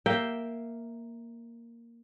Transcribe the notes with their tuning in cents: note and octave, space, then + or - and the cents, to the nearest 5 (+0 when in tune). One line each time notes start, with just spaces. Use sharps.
A#3 +0 E5 +0 G5 +0